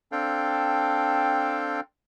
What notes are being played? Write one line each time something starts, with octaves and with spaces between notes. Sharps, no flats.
C4 D4 A4 F5 G5